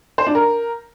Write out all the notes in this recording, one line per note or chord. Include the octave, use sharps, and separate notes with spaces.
C5
D4
A#4